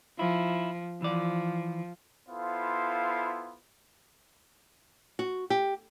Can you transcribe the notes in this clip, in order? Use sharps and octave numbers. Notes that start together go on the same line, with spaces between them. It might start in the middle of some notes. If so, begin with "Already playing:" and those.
F3 E4
E3 F3 D5
B3 E4 F4 A4 C5 F5
F#4
G4